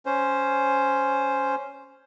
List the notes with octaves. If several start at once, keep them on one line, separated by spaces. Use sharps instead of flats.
C#4 C5